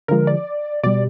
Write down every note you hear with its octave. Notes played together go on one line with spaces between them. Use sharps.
D3 F3 G#3 A#4
D5
B2 G3 D5